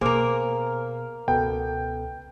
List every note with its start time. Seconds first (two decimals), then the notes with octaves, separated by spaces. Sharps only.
0.01 B2 A#3 G#4 A#4 C5
1.28 C#2 B2 B3 A4 G5